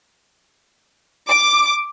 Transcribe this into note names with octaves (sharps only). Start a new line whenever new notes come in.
D6